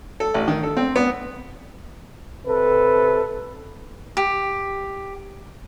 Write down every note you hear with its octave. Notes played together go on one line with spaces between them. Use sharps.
A4
A1
D#3
A4
C4
B3
C3 A4 B4
G4